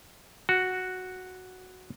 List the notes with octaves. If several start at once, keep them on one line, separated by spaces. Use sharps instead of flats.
F#4